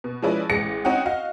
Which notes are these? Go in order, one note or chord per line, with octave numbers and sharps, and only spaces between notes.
B2
F3 G#3 C#4 E4 B4 D5
A1 G#3 A#6 C#7
C4 C#4 D#4 F#4 F#5 G5
F#4 D#5 F5